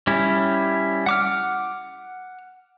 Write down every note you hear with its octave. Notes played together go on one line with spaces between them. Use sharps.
G3 C#4 E4
F#5 D6 F6